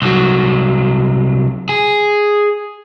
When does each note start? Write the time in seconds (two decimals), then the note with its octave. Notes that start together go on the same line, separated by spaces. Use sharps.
0.02 C2 F#3
1.69 G#4